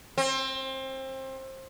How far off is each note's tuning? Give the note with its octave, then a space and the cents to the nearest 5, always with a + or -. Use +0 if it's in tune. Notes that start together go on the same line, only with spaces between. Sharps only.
C4 +25